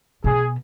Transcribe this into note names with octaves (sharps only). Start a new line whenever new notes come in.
B2 G#4